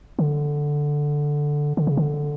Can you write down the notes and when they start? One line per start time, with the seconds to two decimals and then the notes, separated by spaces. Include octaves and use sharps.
0.19 D3
1.77 D3
1.87 C#3
1.97 D3